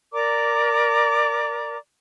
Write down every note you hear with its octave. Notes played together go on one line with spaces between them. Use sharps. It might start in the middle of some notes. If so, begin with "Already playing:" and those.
A#4 D5 A#5 D6